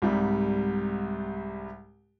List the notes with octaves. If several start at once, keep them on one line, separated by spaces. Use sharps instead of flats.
C2 G#2 G3